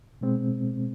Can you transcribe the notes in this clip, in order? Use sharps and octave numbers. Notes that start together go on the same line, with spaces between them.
B2 G#3 C4